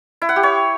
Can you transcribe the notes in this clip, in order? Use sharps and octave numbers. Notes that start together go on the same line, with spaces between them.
E4
F#5
G4
C#5